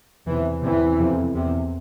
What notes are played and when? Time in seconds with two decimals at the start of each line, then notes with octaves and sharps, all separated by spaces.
0.26 E2 C3 E3
0.62 E2 C3 E3
0.97 F2 C3
1.34 E2 C3